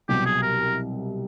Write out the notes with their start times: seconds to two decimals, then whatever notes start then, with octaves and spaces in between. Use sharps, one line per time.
0.09 C2 B2 F#3 G4
0.26 G#4
0.42 A#4